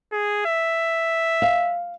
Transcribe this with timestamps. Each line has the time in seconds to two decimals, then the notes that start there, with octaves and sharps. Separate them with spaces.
0.12 G#4
0.46 E5
1.42 F5